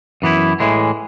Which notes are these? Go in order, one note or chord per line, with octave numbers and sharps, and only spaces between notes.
F#2 E3 B3 E4
A2 E3 G#3